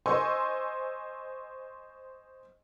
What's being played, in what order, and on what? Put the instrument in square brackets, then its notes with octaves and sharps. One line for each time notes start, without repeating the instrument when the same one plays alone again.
[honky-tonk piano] C5 D#5 G#5 C6 C#6 E6